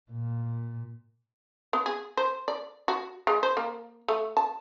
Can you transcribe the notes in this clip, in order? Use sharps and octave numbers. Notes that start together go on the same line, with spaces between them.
A#2
B3
G#4
C5
D5
F#4
G#3
C5
A#3
A3
A5